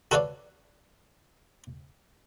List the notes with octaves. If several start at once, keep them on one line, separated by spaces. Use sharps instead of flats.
F#4 A4 B4 C#5 D5 F5